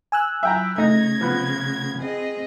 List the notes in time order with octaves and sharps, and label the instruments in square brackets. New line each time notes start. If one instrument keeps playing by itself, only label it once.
[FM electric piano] G#5 E6 F#6
[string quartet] F#3 E4 [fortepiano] E5 G5 A#5
[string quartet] C#3 G#6 [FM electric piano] A3 A#6 [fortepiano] D#4
[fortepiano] F3 B3
[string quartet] C4 G#4 D#5